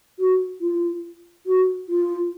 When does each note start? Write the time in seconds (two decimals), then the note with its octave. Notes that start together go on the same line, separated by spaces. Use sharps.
0.19 F#4
0.61 F4
1.46 F#4
1.89 F4